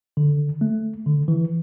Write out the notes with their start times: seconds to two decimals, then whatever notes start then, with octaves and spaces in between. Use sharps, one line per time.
0.17 D3
0.61 A3
1.06 D3
1.28 E3